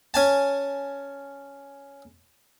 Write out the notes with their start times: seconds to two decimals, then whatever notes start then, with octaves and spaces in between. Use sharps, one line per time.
0.14 C#4 G#5 A5